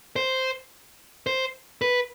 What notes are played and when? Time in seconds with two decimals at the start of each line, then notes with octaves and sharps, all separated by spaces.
0.16 C5
1.27 C5
1.82 B4